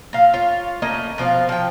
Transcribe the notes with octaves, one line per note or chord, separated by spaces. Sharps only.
A#2 F5
F4 C#5
A3 A#3 C#4 D#5
B2 F3 C4 F5
F3 G5